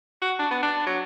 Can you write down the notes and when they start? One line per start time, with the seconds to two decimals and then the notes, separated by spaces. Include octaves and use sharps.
0.22 F#4
0.39 D4
0.51 B3
0.63 D4
0.86 F#3